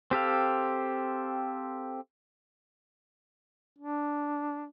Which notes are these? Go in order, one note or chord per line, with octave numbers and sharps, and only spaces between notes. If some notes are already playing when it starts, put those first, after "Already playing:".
C4 G4 A4 F5
D4